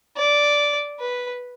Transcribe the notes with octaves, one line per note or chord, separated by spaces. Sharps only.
D5
B4